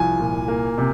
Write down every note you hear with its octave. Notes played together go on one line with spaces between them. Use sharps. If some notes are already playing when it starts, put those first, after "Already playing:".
Already playing: C2 F3 G#5
A#2
A#3
C3